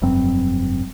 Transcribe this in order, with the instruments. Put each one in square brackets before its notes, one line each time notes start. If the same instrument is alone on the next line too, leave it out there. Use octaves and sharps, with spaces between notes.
[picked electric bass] F1 G2 F#3 C4